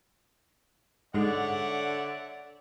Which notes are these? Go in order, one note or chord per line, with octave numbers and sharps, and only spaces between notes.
G#2 D3 G#3 C#5 D5 E5 F#5